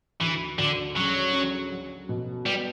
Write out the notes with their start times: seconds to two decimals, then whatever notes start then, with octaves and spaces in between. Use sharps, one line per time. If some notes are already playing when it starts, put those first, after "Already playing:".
0.21 D2 E3
0.58 D2 D3
0.96 C#3 F#3
1.33 C#4
1.72 F#3
2.09 B2
2.46 G3 B3